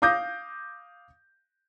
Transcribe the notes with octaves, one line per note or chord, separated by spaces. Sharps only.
F5 D6 D#6 G6 A#6